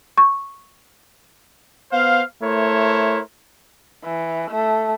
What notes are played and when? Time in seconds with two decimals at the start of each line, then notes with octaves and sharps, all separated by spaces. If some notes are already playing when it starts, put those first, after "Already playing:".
0.18 C#6
1.91 B3 C5 F5
2.42 A3 E4 A#4 C5 C#5
4.04 E3
4.51 A3